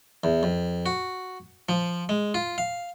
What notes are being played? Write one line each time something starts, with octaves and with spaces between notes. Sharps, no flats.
E2
F2
F#4
F3
G#3
F4
F5